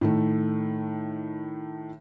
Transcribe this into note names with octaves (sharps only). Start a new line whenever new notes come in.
A2 D#3 A3